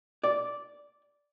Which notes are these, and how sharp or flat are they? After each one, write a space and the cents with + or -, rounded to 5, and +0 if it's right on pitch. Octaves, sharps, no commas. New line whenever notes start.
D5 -10